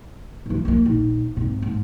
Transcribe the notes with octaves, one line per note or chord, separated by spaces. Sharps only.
G2 E3
F3 A#3
A#1 D#2
G#1 C3
G#2